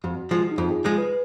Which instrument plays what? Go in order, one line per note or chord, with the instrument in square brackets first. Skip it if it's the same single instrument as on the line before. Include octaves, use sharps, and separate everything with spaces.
[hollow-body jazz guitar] F2 [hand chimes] F#4
[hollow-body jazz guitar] F3 G#3
[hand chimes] D#4
[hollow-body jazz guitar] F2 [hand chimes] F4
[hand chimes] G#4
[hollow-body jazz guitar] F3 G#3 [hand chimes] G#4
[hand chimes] B4